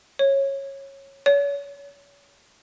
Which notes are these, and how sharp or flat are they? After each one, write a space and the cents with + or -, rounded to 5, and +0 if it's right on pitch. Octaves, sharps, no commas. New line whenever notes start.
C#5 -15
C#5 +35